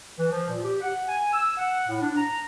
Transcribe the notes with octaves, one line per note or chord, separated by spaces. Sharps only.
E3
F3
A#2
G4
F#5
G#5
E6
F#5
A2
D4
A#5